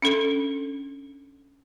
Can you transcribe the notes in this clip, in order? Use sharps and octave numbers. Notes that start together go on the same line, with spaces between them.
C#4 D4 A4